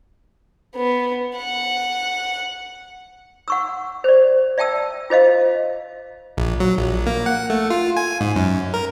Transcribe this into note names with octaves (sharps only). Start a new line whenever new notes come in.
B3
F#5
F#5 C#6 E6
C5 D5
D5 E5 G5 A5 E6
F4 C5 D#5 F5
A#1
F#3
A#1
A#3
F#5
A3
F4
G#5
G#2
F#2
A#4